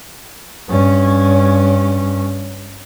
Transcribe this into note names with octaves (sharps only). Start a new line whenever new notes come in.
G2 C#4